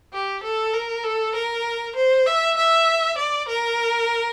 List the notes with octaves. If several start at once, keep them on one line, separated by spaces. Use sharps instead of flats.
G4
A4
A#4
A4
A#4
C5
E5
E5
D5
A#4